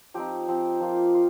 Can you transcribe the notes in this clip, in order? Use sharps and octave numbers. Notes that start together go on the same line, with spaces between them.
F3 C4 D#4 G4
F3 C4 D#4
F3 A#3 F4
F4